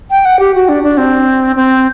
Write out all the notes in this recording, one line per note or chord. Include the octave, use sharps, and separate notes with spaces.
G5
F#5
G4
F#4
D4
D4
C4
C4